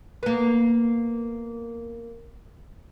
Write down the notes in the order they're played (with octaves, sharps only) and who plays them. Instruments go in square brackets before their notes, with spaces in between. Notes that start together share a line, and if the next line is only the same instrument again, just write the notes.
[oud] A#3 B3